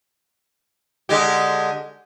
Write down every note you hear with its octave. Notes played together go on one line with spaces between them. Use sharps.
D3 G#3 G4